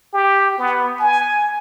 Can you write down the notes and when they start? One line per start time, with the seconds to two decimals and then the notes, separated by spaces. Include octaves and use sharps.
0.14 G4
0.59 B3
1.00 G#5